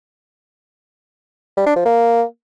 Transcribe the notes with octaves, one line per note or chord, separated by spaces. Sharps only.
G3
D4
F3
A#3